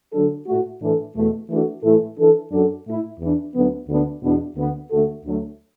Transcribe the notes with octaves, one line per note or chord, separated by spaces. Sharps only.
D3 F#3 D4 A4
A2 A3 F#4
A2 E3 D4 A4
E2 B2 A3
E3 A3 D4 F#4 A4
A2 E3 A3 E4 A4
E3 D4 A4
F#2 F#3 D4 F#4 A4
A2 A3 E4
E2 E3 D4
D2 D3 F#3 B3
D2 D3 B3 D4
E2 B2 B3 D4
D2 D3 B3
D2 D3 A3 F#4 A4
D2 D3 F#3 A3